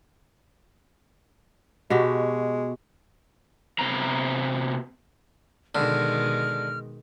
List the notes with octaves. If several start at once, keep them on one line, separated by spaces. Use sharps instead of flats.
B2 G#3 F#4 G4
C3 B3 A#5
B2 D3 D#3 G#3 F6